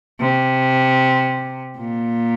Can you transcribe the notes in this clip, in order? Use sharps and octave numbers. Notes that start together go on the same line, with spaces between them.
C3
A#2